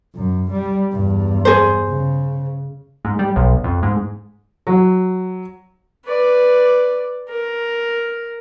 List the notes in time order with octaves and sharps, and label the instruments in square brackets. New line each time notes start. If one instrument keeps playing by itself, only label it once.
[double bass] F#2
G3
E2 G2
[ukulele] G#4 C5
[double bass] C#3
[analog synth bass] G#2
G3
B1
F2
G#2
[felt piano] F#3
[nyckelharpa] B4 D5
A#4